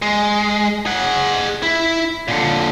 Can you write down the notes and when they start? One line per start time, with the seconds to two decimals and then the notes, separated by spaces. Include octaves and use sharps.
0.02 G#3
0.86 G#4 F#5
1.63 E4
2.28 A#2 D3